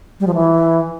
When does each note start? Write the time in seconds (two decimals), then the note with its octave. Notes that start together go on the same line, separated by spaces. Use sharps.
0.20 G3
0.27 F3
0.34 E3